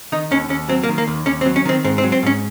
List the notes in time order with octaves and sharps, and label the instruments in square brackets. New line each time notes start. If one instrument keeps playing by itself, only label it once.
[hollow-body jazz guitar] D#3 D#4
D#2 C#4
D#2 C#4
F#3 C4
A#3
D#3
A#3
D#2
D#2 C#4
C4
F#3
C#4
D#3 C4
G#2 C4
C4
F#3
C4
G#2 C#4